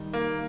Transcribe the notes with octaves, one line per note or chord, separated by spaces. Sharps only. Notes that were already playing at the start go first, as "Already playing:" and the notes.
Already playing: D#3 G3 D#4
A#3